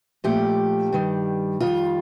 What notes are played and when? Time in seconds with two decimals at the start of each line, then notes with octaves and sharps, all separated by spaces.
0.24 A#2 F3 A3 G4
0.92 G2 D#3 G3
1.60 F2 D#3 G3 F4